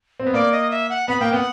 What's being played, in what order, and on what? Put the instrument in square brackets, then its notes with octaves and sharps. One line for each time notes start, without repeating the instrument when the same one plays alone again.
[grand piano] C4
B3
[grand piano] A#3 [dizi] D5
[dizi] D#5
E5
F#5
[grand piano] B3 [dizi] B5
[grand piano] A#3 [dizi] G5
[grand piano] B3 [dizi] G5
[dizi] F#5